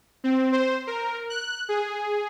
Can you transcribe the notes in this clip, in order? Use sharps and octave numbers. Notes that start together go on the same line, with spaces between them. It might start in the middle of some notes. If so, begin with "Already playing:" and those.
C4
C5
A#4
F#6
G#4